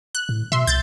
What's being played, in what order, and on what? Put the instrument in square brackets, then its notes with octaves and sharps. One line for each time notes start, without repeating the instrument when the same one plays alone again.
[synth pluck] F#6
[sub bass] A2
[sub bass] B2 [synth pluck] E5 C6
[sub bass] C2 [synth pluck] G6 A6